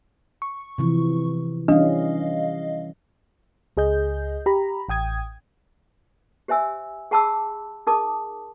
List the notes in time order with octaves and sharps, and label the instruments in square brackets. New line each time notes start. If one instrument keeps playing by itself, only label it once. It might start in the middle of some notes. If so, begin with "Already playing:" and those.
[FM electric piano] C#6
[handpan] C3 E3 F3
[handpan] E3 G3 C#4 [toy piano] D4 [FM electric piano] D#5 F5
[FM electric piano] C#2 G#4 D#5 G6
G4 A#5 B5
A1 G5 D#6 G#6
[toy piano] G4 C5 E5 G#5 E6
G#4 F#5 A5 B5 D6 E6
D#4 G#4 A#4 A5 D6 D#6